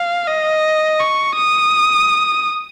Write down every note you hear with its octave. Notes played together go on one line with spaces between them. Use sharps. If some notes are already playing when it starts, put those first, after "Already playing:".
Already playing: F5
D#5
C#6
D#6